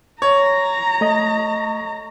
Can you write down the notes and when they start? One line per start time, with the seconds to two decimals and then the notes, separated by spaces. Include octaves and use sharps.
0.22 C#5 A#5
1.01 A3 D#5